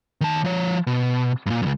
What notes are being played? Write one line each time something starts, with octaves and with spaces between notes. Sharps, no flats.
D#3 A5
F3 C#5
B2
G2 A#2
C#2 F#2